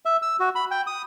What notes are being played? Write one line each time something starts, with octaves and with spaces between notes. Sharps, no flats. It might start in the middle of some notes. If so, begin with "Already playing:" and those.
E5
E6
F#4
B5
G5
D#6